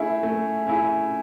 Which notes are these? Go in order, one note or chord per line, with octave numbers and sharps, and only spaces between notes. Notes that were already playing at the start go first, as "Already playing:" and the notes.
Already playing: A3 C#4 E4 G#4 E5
A3
C#4 E4 G#4